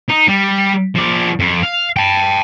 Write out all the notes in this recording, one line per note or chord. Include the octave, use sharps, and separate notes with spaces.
D#4
G3
F3 D5
F2
F5
G5 A5